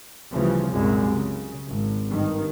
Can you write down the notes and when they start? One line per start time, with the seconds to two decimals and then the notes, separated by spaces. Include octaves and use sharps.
0.33 D2 C#3 E3 F3 G3
0.70 C2 F#2 A#2 G#3
1.13 C#3
1.66 G#1
2.09 G2 D#3